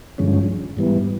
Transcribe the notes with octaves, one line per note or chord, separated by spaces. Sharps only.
G2 D3 F3 G#3 C#4
G#2 E3 G3 B3